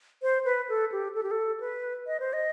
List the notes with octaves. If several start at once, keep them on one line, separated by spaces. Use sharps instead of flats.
C5
B4
A4
G4
A4
G4
A4
B4
D#5
C5
D#5